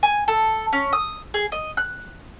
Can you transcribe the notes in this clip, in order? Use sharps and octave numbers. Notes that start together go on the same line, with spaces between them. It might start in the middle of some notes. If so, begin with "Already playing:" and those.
G#5
A4
C#4
D#6
G#4
D#5
F#6